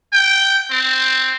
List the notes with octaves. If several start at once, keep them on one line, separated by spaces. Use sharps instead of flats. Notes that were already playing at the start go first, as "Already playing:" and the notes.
G5
C4